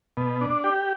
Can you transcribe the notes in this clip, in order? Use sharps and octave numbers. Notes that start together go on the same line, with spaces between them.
B2
D4
G4